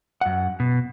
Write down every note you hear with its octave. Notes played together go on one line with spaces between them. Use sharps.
F#2 F#5
B2